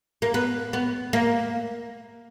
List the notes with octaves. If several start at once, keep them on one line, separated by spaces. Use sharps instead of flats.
A#3
B3
B3
A#3